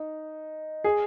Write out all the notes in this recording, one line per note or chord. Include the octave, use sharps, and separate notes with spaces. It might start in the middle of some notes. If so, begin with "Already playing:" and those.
Already playing: D#4
G#4